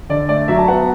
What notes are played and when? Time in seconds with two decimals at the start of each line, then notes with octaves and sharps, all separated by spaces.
0.09 D3 D5
0.29 A3 D5
0.48 F#3 E5
0.59 A5
0.68 B3 F#5